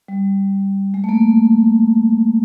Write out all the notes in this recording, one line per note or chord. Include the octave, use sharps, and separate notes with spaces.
G3
G#3
A3
A#3